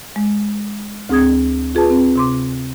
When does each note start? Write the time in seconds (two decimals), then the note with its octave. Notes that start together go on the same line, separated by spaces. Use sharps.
0.16 G#3
1.09 D2 C4 G#4 D#6 G#6
1.75 F4 G#4 B4 A5
1.90 C4
2.16 C3 C6 D6